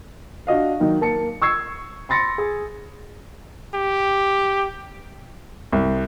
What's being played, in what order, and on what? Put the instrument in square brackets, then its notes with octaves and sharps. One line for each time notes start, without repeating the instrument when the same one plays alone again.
[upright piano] D4 F#4 D#5 F5
D#3 F#3 D#4
A#3 A5 C#7
C#6 E6 G#6 C7
B5 C6 A6 A#6 C#7
G#4
[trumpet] G4
[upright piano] C2